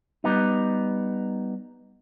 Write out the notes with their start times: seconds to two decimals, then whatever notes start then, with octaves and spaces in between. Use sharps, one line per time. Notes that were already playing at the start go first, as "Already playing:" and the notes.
0.24 G3 B3 D#4